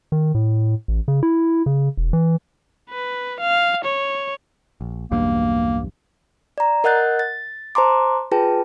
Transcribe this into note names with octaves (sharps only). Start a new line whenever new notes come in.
D#3
A2
A1
C#3
E4
C#3
E1
E3
B4
F5
C#5
A#1
B1 E2 G2 A#3
D5 A#5
A#4 D#5 F#5 F#6 G6 A6
A6
C5 A5 A#5 C6 D6
F4 G#4 B4 G5 A5